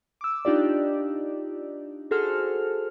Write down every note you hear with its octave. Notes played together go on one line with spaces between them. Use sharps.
D6 E6
D4 D#4 F4 G4 D5
F#4 G#4 A4 C5 F6